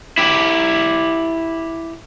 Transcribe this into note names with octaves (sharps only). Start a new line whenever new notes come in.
E4 G4